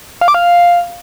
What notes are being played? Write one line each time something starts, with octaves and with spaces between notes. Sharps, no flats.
F5
D6
F5